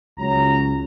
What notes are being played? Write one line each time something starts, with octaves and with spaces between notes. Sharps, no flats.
C#2 F#3 A#5